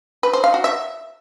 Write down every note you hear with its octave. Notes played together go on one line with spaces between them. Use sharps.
B4
C5
F5
F#4
E5